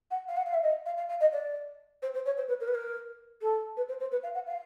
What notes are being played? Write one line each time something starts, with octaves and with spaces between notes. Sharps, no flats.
F#5
F5
F#5
F5
E5
D#5
F5
F5
F5
D#5
D5
C5
C5
C#5
C5
B4
A#4
B4
A#4
A4
B4
C5
C5
B4
F5
F#5
F5